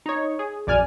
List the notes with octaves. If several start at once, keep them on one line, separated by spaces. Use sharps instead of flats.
D#4 C#5
G#4
A#1 F#2 D5 G#5 F6